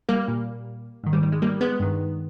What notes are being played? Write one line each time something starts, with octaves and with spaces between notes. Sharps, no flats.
G3 A#3
A#2
G#2 D#3
G3
G3
G#3
G3 A#3
G#3 B3
G2 D#3